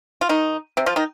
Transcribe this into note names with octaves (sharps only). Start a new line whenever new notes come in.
F4
D#3 D#4
C3 C4
F3 F4
D#3 D#4